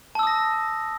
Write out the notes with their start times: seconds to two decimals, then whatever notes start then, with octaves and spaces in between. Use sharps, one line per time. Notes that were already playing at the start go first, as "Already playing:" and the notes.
0.15 A5
0.19 E6
0.23 D#6
0.27 A#6